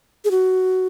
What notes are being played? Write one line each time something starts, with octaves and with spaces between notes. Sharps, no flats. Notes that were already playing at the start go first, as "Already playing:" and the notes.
G#4
F#4